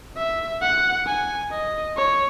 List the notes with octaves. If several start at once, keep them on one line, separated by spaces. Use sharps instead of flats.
E5
F#5
G#5
D#5
C#5